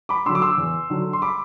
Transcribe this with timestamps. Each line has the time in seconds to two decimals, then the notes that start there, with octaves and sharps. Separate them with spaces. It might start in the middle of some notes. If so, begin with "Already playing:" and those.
0.09 B5 D6
0.26 D3 F#3 C6 E6
0.35 D6
0.42 C6 E6
0.58 E2
0.90 D3 F#3
1.13 C6
1.22 B5 D6